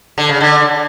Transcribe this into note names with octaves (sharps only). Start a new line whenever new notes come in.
D3
C#3
D3